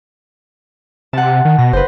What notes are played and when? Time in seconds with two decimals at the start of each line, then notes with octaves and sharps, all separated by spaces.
1.13 C3 F#5 A5
1.45 D#3
1.59 B2 A#6
1.73 F#1 B4 C5